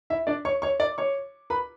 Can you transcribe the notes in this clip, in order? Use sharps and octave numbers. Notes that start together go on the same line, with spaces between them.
E4 E5
D4 D5
C#5 C#6
C#5 C#6
D5 D6
C#5 C#6
B4 B5